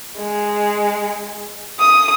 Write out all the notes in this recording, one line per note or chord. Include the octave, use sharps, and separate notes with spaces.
G#3
D#6